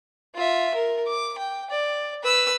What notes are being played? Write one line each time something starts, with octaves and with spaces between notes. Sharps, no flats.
F4 E5
A#4
D6
G5
D5
B4 E6